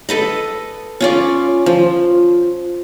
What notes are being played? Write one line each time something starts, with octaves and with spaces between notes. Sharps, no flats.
A4 B4 D#5
C#4 F4 D5
F3